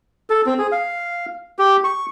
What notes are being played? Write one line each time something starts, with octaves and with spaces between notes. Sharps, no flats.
A4
C4
G#4
F5
G4
C#6